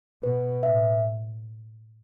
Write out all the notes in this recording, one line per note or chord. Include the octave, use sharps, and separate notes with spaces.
B2 B4
A2 E5